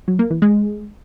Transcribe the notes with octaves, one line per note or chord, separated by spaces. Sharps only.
F#3
A#3
E3
G#3